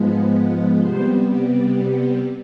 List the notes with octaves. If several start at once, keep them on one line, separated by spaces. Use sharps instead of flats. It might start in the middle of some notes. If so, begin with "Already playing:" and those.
Already playing: G#2 F3 G#3 B3
C3 G3 B3 C5
D5